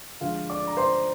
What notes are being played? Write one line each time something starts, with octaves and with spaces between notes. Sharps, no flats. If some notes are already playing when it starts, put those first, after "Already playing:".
D3 F3 G#3 F4 F5
D5 D6
A#5
C5 C6